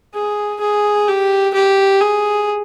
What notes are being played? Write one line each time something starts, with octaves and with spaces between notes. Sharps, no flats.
G#4
G#4
G4
G4
G#4